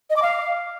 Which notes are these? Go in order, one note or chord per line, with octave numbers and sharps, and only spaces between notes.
D#5
D6
F5